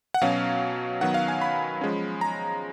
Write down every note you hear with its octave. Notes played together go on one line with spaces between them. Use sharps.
F#5
B2 F#3 C#4 F5
D#3 F#3 B3 F#5
F5
G#5
B5
F3 G#3 C#4
A#5